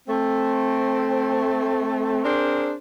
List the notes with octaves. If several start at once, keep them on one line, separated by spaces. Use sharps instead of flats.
A3 C4
C4 D4 G#4 A#4 C5